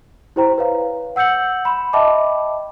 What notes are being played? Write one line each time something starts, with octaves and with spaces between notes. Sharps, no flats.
E4 G4 C5 G5 A#5
B4 C#5 F5
F#5 E6 G6 C#7 F#7
B5 C6 E7
D#5 E5 G5 A5 B5 D6